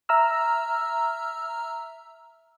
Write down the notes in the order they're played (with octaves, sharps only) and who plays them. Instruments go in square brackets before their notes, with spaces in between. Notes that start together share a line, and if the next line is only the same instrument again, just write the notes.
[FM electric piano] E5 A#5 E6 F6